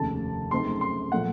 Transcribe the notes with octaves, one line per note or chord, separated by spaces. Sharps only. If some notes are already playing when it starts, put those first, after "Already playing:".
Already playing: F1 D#2 C#3 A3 A5
F#2 C#3 A3 C4 D#4 C6
C6
A#2 F3 A3 F#5